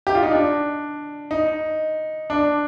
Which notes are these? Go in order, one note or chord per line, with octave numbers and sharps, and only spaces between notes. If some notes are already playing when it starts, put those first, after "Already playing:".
G4
F4
D#4
D4
D#4
D4